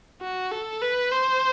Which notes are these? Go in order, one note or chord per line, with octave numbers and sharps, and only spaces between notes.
F#4
A4
B4
C5